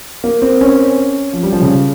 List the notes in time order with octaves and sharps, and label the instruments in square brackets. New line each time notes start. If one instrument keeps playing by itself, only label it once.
[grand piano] A#3
C4
C#4
F3
G3
F3
C#3